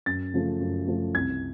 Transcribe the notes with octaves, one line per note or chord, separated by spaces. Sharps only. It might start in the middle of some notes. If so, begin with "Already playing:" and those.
F#2 A6
C#3 F3 A3
F#2
C#3 F3 A3
C2 G#6